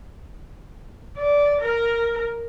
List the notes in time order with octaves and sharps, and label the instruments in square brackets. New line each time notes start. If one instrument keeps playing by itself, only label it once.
[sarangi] D5
A#4